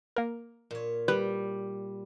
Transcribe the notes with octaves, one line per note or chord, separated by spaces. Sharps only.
A#3 A#4
A#2 C#5
G3 B4